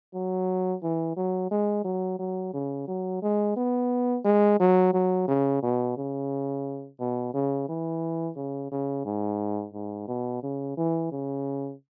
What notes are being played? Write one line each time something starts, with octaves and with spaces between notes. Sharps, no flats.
F#3
E3
F#3
G#3
F#3
F#3
C#3
F#3
G#3
B3
G#3
F#3
F#3
C#3
B2
C#3
B2
C#3
E3
C#3
C#3
G#2
G#2
B2
C#3
E3
C#3